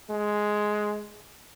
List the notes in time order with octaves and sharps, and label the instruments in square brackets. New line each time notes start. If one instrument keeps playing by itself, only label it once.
[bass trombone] G#3